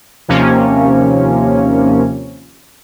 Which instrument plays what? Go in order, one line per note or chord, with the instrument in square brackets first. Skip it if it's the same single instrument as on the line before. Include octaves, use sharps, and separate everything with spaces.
[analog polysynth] D#2 C3 F3 A#3 C#4